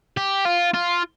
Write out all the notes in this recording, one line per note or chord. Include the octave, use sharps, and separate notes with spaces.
G4
F4
F4